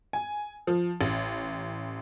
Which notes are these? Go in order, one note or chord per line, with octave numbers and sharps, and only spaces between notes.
G#5
F3
A1